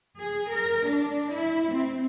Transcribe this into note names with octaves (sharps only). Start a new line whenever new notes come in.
G#4
A#4
D4
E4
C4